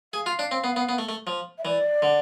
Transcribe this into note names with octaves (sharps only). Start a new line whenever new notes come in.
G#4 F5
F4
D4
C4
B3
B3
B3
A3
A3
F3
E5
E3 D5
D3